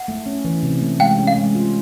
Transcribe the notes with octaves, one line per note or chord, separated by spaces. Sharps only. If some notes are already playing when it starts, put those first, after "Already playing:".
Already playing: F#5
A3
C#4
E3
C3
A3
G#3 F5 G5
C#4
F5
G#3
F4